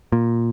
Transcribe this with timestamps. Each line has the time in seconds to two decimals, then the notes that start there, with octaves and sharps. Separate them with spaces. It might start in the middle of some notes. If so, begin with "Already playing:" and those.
0.12 A#2